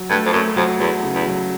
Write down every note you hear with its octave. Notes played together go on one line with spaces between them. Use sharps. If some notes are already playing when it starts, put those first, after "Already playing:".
Already playing: F#3
G2 A3
F2
F#2 A3
F2 F#3
E2 F#3
C#3
E2
F#3